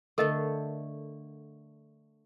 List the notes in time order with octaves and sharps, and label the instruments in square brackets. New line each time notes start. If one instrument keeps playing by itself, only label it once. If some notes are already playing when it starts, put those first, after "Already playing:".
[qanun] D3 A3 [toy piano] A4 A#4 D#5